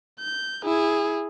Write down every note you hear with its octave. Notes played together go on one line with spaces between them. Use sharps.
G6
E4 G#4